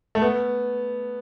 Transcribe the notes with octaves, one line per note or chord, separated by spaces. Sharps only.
A3
B3